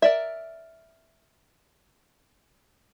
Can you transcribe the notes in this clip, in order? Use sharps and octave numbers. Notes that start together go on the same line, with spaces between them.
A#4 D5 E5